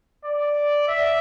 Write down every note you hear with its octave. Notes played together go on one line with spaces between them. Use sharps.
D5
E5